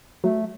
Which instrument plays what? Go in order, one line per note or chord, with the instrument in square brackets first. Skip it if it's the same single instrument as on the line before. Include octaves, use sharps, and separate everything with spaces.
[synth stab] F#3 [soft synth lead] A3